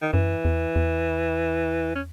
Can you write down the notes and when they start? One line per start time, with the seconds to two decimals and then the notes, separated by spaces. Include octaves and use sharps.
0.02 D#3
0.13 F#2 E3
0.45 E2
0.76 E2
1.95 C#4